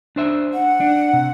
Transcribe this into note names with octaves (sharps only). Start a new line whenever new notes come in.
D4 C5 E5
F#5
D4
C3